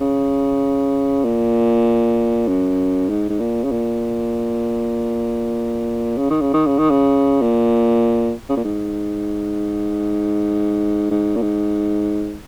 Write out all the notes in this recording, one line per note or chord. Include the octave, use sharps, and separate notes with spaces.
C#3
A#2
F#2
G#2
G#2
A#2
C#3
A#2
C#3
D#3
C#3
D#3
C#3
D#3
C#3
A#2
C#3
A#2
G#2
G#2
A#2
G#2